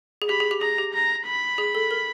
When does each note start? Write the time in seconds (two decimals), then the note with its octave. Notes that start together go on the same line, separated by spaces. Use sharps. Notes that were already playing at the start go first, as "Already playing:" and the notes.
0.22 G#4
0.29 G4 B5
0.40 G#4
0.51 G4
0.61 G#4 A#5
0.78 G4
0.94 A#5
1.27 B5
1.58 G#4
1.75 A4
1.91 A#4